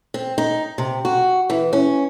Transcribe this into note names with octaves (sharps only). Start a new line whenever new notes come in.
C4
D#4
C3
F#4
E3
C#4